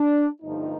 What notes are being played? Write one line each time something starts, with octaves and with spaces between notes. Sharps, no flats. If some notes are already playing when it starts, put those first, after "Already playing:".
Already playing: D4
G1 G2 F3 A3 D#4